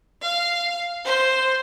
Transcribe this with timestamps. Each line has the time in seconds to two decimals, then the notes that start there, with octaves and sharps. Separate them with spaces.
0.22 F5
1.05 C5